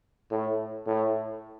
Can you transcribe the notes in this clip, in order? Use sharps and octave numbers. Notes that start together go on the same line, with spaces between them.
A2
A2